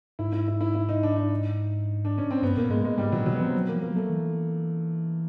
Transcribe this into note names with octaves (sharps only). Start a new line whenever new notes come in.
G#2 E4
E4
E4
E4
E4
D#4
D4
D#4
D4
C#4
C4
G2 B3
A#2 A#3
G#2 G#3
G#3
G#2 G3
A#2 F#3
B2 F#3
B3
F3 C4
F#3
F3 A#3
A#3
F#3
A3
E3